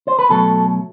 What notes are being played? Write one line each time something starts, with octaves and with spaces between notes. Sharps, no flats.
C5
B4
B2 F#3 A3 A4